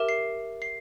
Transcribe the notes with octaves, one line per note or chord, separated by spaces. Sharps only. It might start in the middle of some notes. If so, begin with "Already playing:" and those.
Already playing: G4 A#4 E5
C7
C7